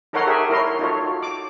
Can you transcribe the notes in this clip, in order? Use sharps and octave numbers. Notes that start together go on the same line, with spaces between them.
D#4 A4 A#4 C#5 F#5 C6
G4 G#4 A#4 E5
E4 A#4 C#5 C6
D#4 F4 F#4 A4 C#5
D6